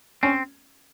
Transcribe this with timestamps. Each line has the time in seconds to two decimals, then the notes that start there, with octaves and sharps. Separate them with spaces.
0.23 C4 C#4